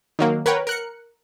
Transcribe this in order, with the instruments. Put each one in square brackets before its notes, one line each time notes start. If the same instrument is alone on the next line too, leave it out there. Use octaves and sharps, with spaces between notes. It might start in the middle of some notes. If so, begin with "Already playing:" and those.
[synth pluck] D#3 F#3 A#3
A#4 B4 C#5 F#5 G5
A#4 F#6 C#7